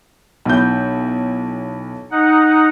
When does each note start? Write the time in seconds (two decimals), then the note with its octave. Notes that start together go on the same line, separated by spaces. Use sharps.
0.45 B1 E4 G6
2.11 D#4 F#5